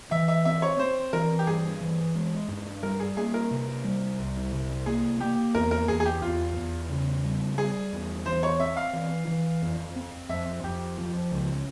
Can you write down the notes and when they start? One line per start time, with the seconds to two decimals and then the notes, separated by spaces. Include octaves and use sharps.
0.11 E3 E5
0.28 E5
0.45 C4 E5
0.62 C#5
0.79 C4 C5
1.13 E3 A#4
1.39 G4
1.47 G2 G#4
1.81 E3
2.15 G#3
2.48 G2
2.83 G3 A#4
3.00 G#4
3.17 A#3 G#4
3.34 A#4
3.51 C3
3.84 G3
4.19 C2
4.52 C3
4.86 A#3 G#4
5.20 A#3 G4
5.55 E2 A#4
5.71 A#4
5.88 E2 G#4
6.00 G#4
6.05 G4
6.22 E2 F4
6.56 E2
6.90 C#3
7.24 G3
7.58 G3 G#4
7.93 E2
8.26 E3 C5
8.43 C#5
8.59 C4 E5
8.77 F5
8.93 E3
9.27 E3
9.62 F2
9.96 C4
10.29 F2 E5
10.64 F2 G4
10.98 F3
11.31 C#2